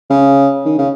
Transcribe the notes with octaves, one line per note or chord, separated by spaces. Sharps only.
C#3
D#3
C#3